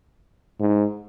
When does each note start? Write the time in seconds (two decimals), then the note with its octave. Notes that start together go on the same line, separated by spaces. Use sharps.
0.60 G#2